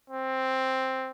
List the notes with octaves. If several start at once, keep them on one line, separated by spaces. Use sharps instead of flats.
C4